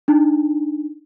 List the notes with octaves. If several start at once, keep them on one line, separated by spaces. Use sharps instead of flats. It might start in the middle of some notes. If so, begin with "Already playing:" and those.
D4 D#4